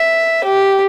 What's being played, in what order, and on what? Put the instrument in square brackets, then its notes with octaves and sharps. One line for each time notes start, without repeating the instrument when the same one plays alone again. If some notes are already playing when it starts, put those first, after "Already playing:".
Already playing: [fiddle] E5
G4